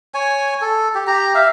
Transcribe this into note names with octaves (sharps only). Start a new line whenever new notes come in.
C#5 G#5
A4
G4
G4 A#5
E5 F5